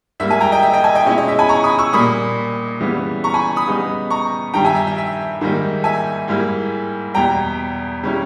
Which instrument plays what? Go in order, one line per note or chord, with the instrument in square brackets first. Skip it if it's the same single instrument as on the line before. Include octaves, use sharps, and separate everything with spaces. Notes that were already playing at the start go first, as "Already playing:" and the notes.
[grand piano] G#2 G3 A#3 E5
E5 G#5
G5 A#5
D#5 G5
E5
D#5 G5
E5 G#5
D#5 G5
B2 G#3 C#4 E4 D#5
D#5
E5
G#5 B5
A#5 C#6
B5 D#6
C#6 E6
A#2 G3 A#3 B5 D#6
C#3 E3 G3 B3
A#5 C#6
G#5 B5
B5 D#6
C#3 G3 B3 D#4
A#5 C#6
G2 D#3 G3 G5 A#5
E5 G#5
E5
E5
E5
G#2 D#3 G3 A#3 D#4
E5 G#5
G#2 G3 A#3 E4
E2 B2 G3 G5 A#5
C#3 G3 C#4 E4